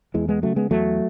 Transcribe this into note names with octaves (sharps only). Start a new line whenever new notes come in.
E2 E3 G#3
G#3 B3
C#3 F#3 A3
G#3 B3
E2 F#3 A3